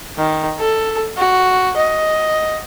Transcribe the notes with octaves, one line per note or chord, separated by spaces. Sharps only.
D#3
A4
F#4
D#5